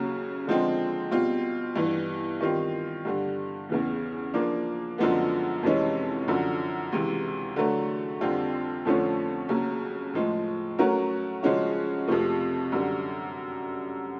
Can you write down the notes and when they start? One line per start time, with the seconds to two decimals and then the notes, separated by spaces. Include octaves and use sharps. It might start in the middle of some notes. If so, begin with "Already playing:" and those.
Already playing: D#2 C#3 F#3
0.47 D3 F3 G#3 C4
1.11 B2 G3 C4 F4
1.76 G2 E3 G3
2.40 D#3 G3 C4 F4
3.05 G2 D3 G3
3.69 E2 C#3 E3
4.34 F3 A#3 D4
4.98 F#2 D3 F3 G#3 B3
5.63 F2 C3 E3 G#3 C#4
6.27 F#2 D3 F3
6.92 C#2 C3 E3
7.56 D3 F#3 A3
8.21 F2 D3 G3 C4 F4
8.85 F2 D3 F3 A3 C#4
9.49 D#2 C#3 F#3
10.13 A2 F3 G#3
10.79 F#3 A3 C#4 F#4 A#4
11.43 C#3 F3 G#3 C#4 F#4
12.08 F2 C3 F3 A3
12.72 F#2 D3 G3